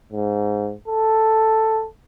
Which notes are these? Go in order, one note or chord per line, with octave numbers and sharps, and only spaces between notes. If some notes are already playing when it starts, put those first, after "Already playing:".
G#2
A4